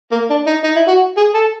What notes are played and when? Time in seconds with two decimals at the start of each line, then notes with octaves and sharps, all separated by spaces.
0.12 A#3
0.30 D4
0.47 D#4
0.64 D#4
0.76 E4
0.88 F#4
1.17 G#4
1.34 A4